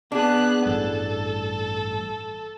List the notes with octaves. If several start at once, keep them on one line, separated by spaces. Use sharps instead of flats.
B3 D4 G#4 F#6
A1 G2 A4